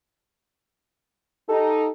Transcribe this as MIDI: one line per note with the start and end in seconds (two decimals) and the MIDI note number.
1.49 1.86 63
1.49 1.86 67
1.49 1.90 69